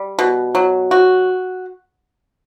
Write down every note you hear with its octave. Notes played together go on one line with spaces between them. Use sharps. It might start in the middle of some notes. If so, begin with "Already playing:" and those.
Already playing: G3
B2
F#3
F#4